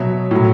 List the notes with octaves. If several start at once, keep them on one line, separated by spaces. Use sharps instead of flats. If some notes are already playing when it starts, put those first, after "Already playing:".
Already playing: B2 F#3 C#5 E5
A2 F#3